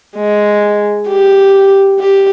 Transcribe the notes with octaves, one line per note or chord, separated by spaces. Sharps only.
G#3
G4
G4